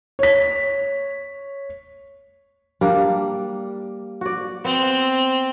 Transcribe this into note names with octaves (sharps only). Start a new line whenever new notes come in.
C#5 B6
G3 A#3 D4
F#4 D5
B3 C4